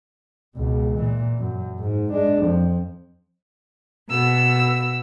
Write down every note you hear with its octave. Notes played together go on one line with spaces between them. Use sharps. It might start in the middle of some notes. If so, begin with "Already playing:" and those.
C#2 B2
A#2 E3
F#2
G#2
G#3 D4
F2 F3
B2 E6